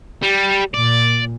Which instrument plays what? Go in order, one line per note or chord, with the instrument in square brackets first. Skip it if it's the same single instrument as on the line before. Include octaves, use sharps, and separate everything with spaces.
[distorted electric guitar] G3
[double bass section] A#2 [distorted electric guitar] D5